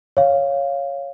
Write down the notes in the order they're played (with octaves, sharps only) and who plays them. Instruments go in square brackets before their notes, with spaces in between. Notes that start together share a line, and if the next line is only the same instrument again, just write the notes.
[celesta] C#5 F5